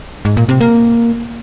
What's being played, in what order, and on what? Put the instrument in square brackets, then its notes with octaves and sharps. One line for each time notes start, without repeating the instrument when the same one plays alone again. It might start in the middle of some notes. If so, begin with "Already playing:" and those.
[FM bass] G#2
A#2
C3
A#3